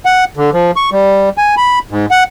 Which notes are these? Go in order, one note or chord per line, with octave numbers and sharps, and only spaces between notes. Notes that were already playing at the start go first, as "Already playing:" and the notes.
F#5
D3
F3
C#6
G3
G#5
B5
G#2
F#5